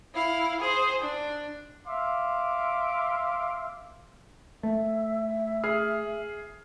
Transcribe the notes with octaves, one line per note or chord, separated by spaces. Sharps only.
E4 F5
G#4 C5
D4
E5 F5 C6 D6
A3 E5
G#4 F6 C7